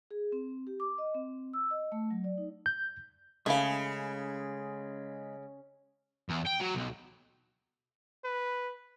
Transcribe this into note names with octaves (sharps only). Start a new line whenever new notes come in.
G#4
C4
G4
D6
D#5
C4
E6
D#5
A3
F#3
D5
D#4
G6
C#3 G#3 A3 G#4 F5 B5
E2
G5
F#3
B1
B4